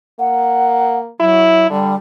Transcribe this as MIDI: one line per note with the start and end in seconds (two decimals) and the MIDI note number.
0.20 1.10 58
0.20 0.99 78
1.20 1.67 54
1.20 1.67 64
1.70 1.93 50
1.70 1.95 55